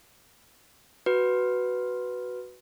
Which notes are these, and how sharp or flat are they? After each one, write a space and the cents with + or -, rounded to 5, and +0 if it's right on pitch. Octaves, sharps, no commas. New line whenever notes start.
F#4 +5 B4 +0